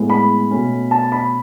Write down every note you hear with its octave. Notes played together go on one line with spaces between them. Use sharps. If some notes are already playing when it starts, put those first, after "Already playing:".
Already playing: A2 G#3 B3
B5
B2 A3 C#4
A5
B5